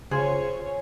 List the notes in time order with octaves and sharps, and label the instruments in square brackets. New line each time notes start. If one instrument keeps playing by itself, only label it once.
[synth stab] C#3 F4 [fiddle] C#4 C#5 [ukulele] G#4 [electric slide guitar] C5